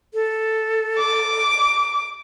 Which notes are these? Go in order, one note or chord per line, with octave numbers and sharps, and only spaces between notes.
A4
D6